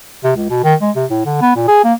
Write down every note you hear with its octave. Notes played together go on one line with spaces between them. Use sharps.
C3
C#2
B2
D#3
G#3
C3
A2
D3
B3
A#2
G#4
A#3